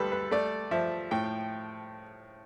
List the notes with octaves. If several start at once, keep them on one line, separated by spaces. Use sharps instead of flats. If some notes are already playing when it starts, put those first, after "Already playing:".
Already playing: D2 G3 A4 B4
B4
A3 D5
F3 E5
A2 G5